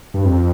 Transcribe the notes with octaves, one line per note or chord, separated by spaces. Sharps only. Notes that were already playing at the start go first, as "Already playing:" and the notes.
G2
F2